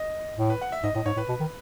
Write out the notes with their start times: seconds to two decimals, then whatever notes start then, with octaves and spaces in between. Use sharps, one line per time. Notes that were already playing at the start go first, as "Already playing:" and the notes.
Already playing: D#5
0.38 A2
0.50 B4
0.62 F#5
0.72 E5
0.83 G#2 D#5
0.95 A2 D#5
1.06 G#2 C#5
1.17 A2 B4
1.29 B2
1.40 D#3